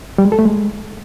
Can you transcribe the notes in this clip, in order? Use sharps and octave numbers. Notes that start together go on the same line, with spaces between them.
G3
G#3
A4
A3
G#3